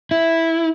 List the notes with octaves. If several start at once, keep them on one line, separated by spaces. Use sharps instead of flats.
E4